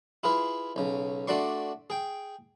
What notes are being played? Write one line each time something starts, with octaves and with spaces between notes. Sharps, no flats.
E4 F4 G#4 B4
B1 C#3
A3 D4 F#4 D5 C6 C#6
G#4 G5